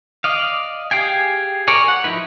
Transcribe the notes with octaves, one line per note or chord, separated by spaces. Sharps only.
D5 D#5 F5
G4 G#4 F5 G5 G#5
A#4 C#5 D5 G#5
F#5
F3 D#4 E4 B4